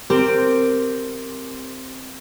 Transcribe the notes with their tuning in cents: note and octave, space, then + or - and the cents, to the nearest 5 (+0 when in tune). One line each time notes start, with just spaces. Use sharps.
C4 +0 G4 +0 A#4 -15